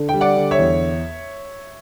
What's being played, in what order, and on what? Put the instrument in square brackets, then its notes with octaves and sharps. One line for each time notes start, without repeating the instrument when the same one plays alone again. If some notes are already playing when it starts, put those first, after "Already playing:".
Already playing: [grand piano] D3
G3 G5
D5 F#5
D3
C#5 E5
E2